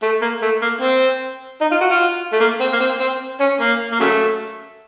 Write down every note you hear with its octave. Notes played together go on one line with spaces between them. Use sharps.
A3
A#3
A3
A#3
C4
D#4
F4
F#4
F4
A3
A#3
C4
A#3
C4
C4
C#4
A#3
A#3
C#3 F#3 A3